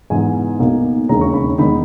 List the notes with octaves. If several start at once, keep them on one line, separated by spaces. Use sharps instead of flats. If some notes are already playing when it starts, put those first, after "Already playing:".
G#2 E3 B3 D#4 G#5
B1 B2 A#3 D#4
E1 D#2 C#3 G#3 D#4 A#5
C#6
B5
E2 D#3 G#3 D#4 B5